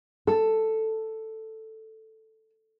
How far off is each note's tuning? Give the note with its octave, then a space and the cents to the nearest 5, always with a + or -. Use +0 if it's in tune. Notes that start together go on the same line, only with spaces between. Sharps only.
A4 +5